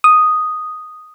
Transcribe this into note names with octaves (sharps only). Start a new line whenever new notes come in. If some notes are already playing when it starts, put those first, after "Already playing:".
D#6